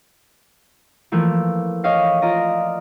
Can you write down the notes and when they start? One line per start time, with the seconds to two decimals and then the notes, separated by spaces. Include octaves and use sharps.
1.12 E3 F3 A3 A#3
1.84 C#5 D#5 F5 C#7
2.22 F4 D5 D#5 A#5